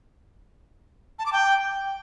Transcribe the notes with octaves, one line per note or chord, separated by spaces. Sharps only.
A5
D6
G5